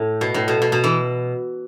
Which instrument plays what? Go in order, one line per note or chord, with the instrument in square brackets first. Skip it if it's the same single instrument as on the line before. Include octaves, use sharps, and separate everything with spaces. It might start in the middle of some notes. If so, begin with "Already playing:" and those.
Already playing: [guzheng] A2
B2
A2
B2
B2
B2
E3